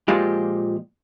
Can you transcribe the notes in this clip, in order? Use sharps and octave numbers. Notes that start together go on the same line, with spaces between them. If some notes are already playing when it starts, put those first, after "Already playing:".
A#2 F3 G#3 G4